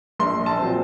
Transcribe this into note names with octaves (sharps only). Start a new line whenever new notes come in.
A#1 C6
A5
A#2 F#3 C4